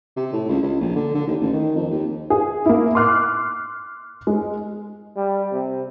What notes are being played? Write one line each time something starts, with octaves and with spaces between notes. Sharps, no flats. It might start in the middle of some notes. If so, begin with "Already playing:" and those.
C3
A2
C#2
C#2
A#1
D3
D3
D#2
A1
D#3
F2
D#2
G#4
A#3 E4
C6 D6 F6 F#6 C7
G#3
G3
C3